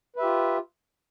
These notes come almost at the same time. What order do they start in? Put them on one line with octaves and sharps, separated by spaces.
B4 E5 G4 F4